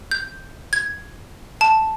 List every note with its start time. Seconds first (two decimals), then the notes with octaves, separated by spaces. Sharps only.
0.11 G6
0.73 G#6
1.61 A5